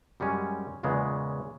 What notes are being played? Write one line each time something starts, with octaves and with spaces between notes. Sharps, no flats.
F#2 G3 G#3 C#4
E2 A#2 C#3 G#3 A#3 B3